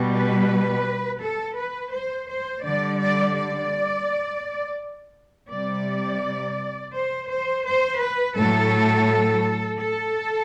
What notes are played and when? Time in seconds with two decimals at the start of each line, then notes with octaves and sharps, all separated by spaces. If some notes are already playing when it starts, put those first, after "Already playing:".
Already playing: B2 G3
0.15 B4
1.22 A4
1.57 B4
1.94 C5
2.29 C5
2.64 D3 G3 D5
3.01 D5
3.36 D5
5.51 C3 G3 D5
6.95 C5
7.30 C5
7.66 C5
8.01 B4
8.37 A2 F#3 A3 A4
9.80 A4